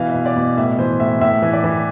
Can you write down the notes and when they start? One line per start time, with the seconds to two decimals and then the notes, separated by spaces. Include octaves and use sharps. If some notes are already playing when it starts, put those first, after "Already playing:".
Already playing: B2 E3 F5
0.09 E5
0.14 B2
0.26 D5
0.36 B2
0.57 A2 E5
0.78 E3 C5
1.00 A2 E5
1.21 A2 E5
1.42 E3
1.53 D5
1.64 E3